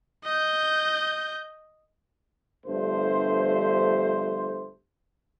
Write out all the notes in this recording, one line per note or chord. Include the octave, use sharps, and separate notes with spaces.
D#5 G6
G1 G2 F3 A3 C5